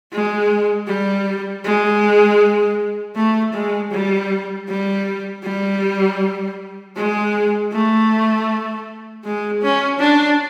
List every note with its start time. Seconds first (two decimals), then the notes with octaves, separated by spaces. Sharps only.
0.12 G#3
0.87 G3
1.64 G#3
3.16 A3
3.54 G#3
3.91 G3
4.68 G3
5.43 G3
6.96 G#3
7.72 A3
9.24 G#3
9.62 C#4
10.00 D4